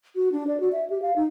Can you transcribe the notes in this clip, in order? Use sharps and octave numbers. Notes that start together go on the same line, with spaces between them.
F#4
D4
D5
F#4
E5
G4
F5
D#4